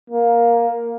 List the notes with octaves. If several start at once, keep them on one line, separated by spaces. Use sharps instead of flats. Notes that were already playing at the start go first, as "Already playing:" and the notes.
A#3